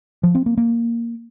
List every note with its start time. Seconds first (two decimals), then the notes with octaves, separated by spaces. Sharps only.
0.23 F3
0.35 C4
0.46 A#3
0.57 A#3